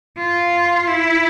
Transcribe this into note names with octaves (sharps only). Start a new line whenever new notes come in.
F4
E4